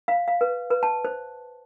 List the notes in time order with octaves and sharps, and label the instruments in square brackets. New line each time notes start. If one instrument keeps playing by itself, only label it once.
[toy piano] F5
F5
B4
B4
A5
C5